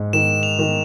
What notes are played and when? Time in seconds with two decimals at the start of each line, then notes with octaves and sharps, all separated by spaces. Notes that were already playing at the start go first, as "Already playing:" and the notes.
Already playing: G#2
0.13 D#3 E7
0.43 F7
0.59 D#3